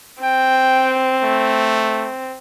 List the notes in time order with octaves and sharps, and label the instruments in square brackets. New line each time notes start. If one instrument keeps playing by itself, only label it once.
[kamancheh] C4 [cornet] G5
[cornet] A3